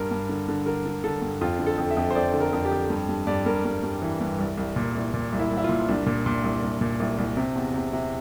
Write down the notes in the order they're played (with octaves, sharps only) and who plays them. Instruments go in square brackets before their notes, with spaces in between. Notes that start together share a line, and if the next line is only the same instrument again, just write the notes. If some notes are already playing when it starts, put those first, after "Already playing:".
Already playing: [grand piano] G2 A#4
G2
D3
D3
D3 A#4
D3
D3 A4
G2
F2 F4
D3
A4
F2
E5
F2
C5
F2 D5
D3
A#4
F2
G4
F2
G2
G2
G2 D5
G2 A#4
G2
G2
E3
G2
C2
C2
A#2
C2
A#2
C2
E4
C2
E4
F4
A#2
C2 D4
A#2
A#2
C2
C2
A#2
C2
C2
C3
E2
C3
C3